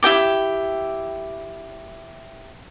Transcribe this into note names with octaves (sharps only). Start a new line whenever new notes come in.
E4 G4 G5 D6